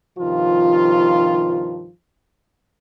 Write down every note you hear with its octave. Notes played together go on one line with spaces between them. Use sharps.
G2 C3 D#3 F3 F4